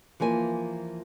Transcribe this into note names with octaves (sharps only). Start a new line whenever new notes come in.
E3 F3 A#3 G#5